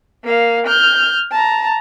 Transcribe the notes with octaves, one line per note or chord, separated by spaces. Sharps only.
A#3 F5
F6 G6
A5 A#5